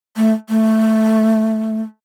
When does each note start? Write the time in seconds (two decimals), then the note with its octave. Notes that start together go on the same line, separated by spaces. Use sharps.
0.17 A3
0.49 A3